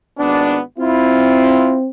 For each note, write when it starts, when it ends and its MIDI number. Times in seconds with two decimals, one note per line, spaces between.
0.18 0.59 32
0.18 0.59 59
0.18 0.59 62
0.79 1.90 60
0.79 1.77 64
0.79 1.77 65